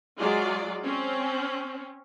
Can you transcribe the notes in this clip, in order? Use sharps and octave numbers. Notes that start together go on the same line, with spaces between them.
F#3 G#3 F4 D5
C4 C#4